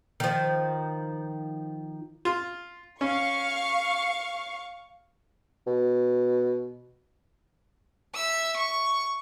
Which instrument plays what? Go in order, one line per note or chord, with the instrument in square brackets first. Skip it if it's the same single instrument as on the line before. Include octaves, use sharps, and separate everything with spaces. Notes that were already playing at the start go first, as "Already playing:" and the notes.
[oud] D#3 F3
[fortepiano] F4
[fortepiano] C#4 [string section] F5 C#6
[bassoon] B2
[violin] E5 E6
C#6